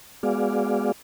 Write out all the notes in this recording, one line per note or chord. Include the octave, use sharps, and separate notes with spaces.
G#3 B3 F#4 G#4 D5 F5